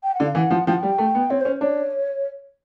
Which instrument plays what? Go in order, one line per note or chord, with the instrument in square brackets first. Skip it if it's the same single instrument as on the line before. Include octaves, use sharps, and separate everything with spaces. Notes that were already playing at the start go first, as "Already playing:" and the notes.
[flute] G5
F#5
[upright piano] D3
[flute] F5
[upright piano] E3 [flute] F#5
[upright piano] F3
[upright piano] F3 [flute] G5
[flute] F#5
[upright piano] G3 [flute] G5
[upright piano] A3
B3
[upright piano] C4 [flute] C#5
[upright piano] C#4 [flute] C5
[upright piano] D4 [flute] C#5